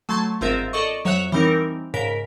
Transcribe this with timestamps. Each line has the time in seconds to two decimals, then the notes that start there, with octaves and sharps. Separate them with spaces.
0.09 F#3 A3 A5 C6 G#6
0.41 G1 G#2 C4 F4 A#4 E5
0.73 A4 D5 D#5 C#6
1.05 F2 F#3 C#5 E5 F#5 F#6
1.32 E3 G3 C4 D#4 A#4
1.94 G#2 C#3 A#4 B6